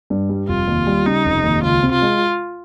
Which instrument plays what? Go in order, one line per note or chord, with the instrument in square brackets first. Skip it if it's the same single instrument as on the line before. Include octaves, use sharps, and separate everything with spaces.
[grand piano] G2
G3
[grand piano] F1 [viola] F4
[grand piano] D#2
G3
[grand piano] C#3 [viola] D#4
[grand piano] F1
D#2
[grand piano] C#2 [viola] F4
[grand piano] C3
[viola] F4
[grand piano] G#3